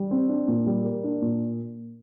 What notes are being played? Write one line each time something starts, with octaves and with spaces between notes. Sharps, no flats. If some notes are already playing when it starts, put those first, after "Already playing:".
Already playing: G3
C4
D4
A#2
G3
A#3
D4
A#2